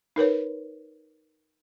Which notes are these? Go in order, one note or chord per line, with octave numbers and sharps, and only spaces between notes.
D#4 A#4 B4 C#5